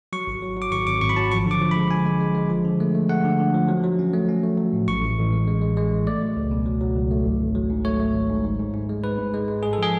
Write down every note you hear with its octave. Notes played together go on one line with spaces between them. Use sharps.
F#3 C#6
G#1
F#3
F#3 D6
G#1 C#6
G#1 D6
G#1 C#6
B5
F#3 A5
F3 C#6
D3 D6
F3
B5
G#3
D3 G#5
G#3
G#3
G#3
F3
D3
A3
A3
A3 F#5
D3
D3
F3
F#3
F#3
C#4
A3
C#4
A3
F#3
A2
A1 C#6
A1
A1
G#3
G#3
G#3
G#3
A1
A3 D5
F#3
C#2
B2
F#3
F#3
C#2
A3
G#1
G#1
F#3
G#2
A3 C#5
A3
G#1
G#2
G#2
G#2
G#2
G#3
G#2 B4
G#2
G#3
G#3
G#3 G#4
A4
F3 G#4